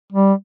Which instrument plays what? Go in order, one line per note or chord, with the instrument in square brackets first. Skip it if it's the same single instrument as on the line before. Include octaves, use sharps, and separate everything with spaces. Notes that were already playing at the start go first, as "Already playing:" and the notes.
[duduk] G3